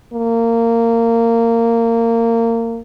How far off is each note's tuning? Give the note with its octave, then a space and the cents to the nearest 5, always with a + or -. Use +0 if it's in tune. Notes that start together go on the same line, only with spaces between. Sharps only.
A#3 -20